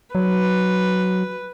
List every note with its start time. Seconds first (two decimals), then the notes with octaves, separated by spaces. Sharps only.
0.15 F#3 B4